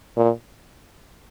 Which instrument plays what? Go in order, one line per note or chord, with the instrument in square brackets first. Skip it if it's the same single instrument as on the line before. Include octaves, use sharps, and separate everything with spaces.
[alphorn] A#2